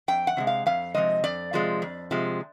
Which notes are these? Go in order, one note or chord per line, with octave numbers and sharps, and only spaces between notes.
F2 G5
F#5
C3 F3 G#3
F5
F2 F5
C3 F3 G#3 D#5
F2 D5
C3 F3 G#3
F2
C3 F3 G#3